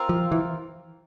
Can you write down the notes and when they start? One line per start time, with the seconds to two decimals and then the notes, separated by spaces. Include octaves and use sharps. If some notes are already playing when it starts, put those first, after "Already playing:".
Already playing: C4 F4 A#4
0.09 F3
0.32 E3